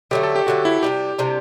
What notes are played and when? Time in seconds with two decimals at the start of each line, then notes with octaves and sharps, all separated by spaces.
0.11 D3 F#3 A3 G4
0.23 A4
0.36 G4
0.47 D3 F#3 A3 F#4
0.65 E4
0.83 C3 G3 D4 G4
1.19 C3 G3 D4